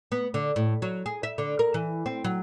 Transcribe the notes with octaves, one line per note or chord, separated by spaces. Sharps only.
B3
D3
A2
F#3
G#4
E5
D3
A#4
E3
C4
F#3